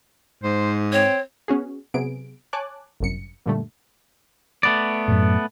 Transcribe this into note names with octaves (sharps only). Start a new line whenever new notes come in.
G#2 C5
C4 C#5
B3 C#4 F#4 G#4
C3 F#3 B3 G#4 D7
C#5 G#5 A5 D6 F#6
G1 C2 F#2 C#7
F#2 A#2 D3 G3 A3
A3 B3 D5
F#2 A2